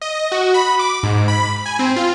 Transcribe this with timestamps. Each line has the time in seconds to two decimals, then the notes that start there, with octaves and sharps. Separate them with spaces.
0.01 D#5
0.32 F#4
0.54 B5
0.79 D6
1.03 G#2
1.28 B5
1.66 G#5
1.79 C4
1.96 F4